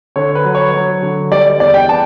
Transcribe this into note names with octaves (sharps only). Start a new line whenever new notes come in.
D3 C#5
B4
F#3
C#5
F#3
D3
G3 D5
E2 D5
G5
B3 A5